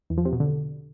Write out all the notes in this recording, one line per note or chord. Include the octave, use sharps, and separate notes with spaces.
E2
F3
C3
B2
D3